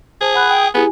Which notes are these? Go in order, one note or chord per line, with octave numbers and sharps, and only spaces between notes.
G#4 C5 A5
F#5 B5 F#6
G5 D#6
B3 E4 G4 G#4 G#5